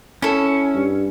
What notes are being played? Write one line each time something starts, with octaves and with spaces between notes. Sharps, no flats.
C#4 E4 A4
G2